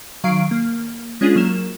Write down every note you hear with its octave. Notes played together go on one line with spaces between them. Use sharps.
D#3 F#3 F5 C#6 C7 D7
A#3
G#3 C#4 D4 F4 G#4
F#3 A#3 A#4 E7